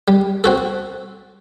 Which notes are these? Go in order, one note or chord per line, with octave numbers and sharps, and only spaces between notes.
G3
C4 F#4 A4